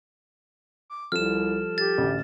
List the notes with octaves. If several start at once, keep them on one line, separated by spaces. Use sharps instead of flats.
D6
C2 F3 G3 A4 F6 E7
G4 A6
A1 D2